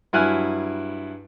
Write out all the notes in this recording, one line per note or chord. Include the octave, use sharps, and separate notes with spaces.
G2 F#3 E4 G#5 F6 F#6